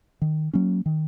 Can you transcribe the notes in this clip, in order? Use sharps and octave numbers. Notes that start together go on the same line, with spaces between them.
D#3
F#3 A#3 C#4
D#3